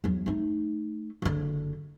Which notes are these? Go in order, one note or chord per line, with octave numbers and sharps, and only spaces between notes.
E2 F#3
A3 D#4
F#1 D3